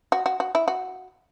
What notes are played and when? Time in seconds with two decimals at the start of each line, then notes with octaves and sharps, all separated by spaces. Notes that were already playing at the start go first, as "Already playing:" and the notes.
0.12 F#4
0.26 F#4
0.40 F#4
0.55 E4
0.68 F#4